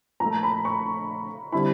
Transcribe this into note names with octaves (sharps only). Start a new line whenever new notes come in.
A#2 F3 A3 A#5
B5
C#6
D3 G3 C4 E4 B5